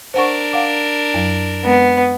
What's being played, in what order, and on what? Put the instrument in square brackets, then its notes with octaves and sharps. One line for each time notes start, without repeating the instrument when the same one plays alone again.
[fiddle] D4 A#4 [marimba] C5 F#5 C#6
[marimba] F5 F#5 D6
F#2 F#3
[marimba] G#3 C4 [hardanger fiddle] B3